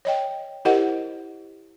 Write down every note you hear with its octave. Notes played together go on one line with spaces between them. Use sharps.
C#5 D#5 G5
E4 G4 A#4 C5 D#5 F#5